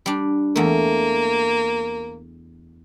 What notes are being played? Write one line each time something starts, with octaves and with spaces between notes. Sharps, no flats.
G3 D4
E2 A3 A#3